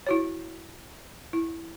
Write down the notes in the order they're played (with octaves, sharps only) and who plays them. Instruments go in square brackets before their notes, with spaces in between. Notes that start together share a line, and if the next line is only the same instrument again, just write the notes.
[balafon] E4 F#4 C#5
E4